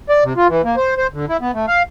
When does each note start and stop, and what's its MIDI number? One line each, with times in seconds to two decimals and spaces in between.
0.09 0.24 74
0.24 0.33 48
0.37 0.48 65
0.49 0.62 52
0.64 0.76 58
0.77 0.94 72
0.97 1.07 72
1.13 1.25 50
1.29 1.37 64
1.41 1.51 59
1.54 1.66 57
1.68 1.83 77